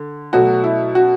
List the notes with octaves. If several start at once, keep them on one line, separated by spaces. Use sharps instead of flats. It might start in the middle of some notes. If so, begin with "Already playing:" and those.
Already playing: D3
B2 F#3 A3 F#4
E4
F#4